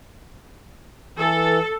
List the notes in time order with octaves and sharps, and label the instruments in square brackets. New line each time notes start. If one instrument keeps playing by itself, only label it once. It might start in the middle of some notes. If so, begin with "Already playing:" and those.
[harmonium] E3 [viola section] A4